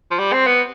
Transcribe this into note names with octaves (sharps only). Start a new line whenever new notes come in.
F3
G3
C4
B3